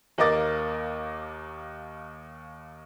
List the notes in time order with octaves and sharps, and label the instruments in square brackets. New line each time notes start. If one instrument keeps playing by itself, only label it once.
[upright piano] D#2 A#3 A#4 D#5 D6 A6